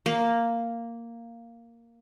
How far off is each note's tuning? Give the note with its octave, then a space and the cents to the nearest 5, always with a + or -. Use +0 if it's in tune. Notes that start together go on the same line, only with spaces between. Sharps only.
A#3 -5